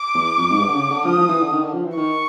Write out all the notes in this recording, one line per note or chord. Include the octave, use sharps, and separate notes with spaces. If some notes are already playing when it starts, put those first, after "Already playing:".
Already playing: D6
E2
F2
G#2
G2
D3
C#3
D3
F3 D#6
F3
E3
D3
D#3
D3
F3
E3
D#3 C#6